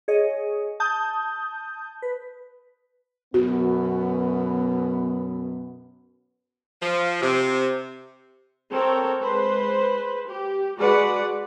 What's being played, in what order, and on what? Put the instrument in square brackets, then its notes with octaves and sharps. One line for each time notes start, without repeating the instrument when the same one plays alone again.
[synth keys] G#4 C#5 D#5
A5 D#6 G6
B4
[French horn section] F#2 B2 B3 [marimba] F#4
[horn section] F3
C3
[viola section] C4 A4 A#4 C#5 G5
G#3 B4 C5
G4
G#3 F#4 G#4 B4 D5 F#5